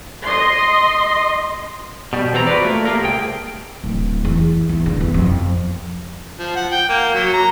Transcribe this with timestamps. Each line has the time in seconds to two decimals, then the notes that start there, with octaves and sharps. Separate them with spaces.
0.23 D#5 C6
2.13 B2 G3
2.33 E2 B3 C4 A4 A#5
2.47 F4 F#4 B4 D5
2.65 A3 A#3
2.85 A3 A#3 F4 G4 A#4
3.01 C2 G#4 G5
3.84 D1
4.25 E2
4.69 E2
4.86 D3
5.00 E2
5.14 F2
6.39 F3
6.56 F#5
6.72 G5
6.89 A#3
7.14 F#3
7.34 A#5